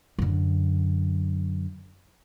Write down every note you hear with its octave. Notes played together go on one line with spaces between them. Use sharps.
F#2 D3